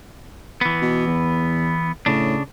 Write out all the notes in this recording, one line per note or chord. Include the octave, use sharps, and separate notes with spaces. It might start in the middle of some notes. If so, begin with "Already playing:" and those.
E3 B3
B2
E2
A2 C#3 D4